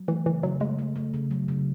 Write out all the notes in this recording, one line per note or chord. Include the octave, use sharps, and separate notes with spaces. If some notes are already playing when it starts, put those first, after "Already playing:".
Already playing: F#3
E3 A3
C#3 E3
C#3 F#3
G#3 A3
A3
A3
C#3
F#3
C#3